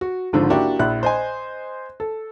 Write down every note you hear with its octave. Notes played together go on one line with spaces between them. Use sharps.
F#4
G#1 G#2 D3 F3
A#3 D4 E4 F#4 G4
A#1 E4 F#6
C5 D#5 G#5
A4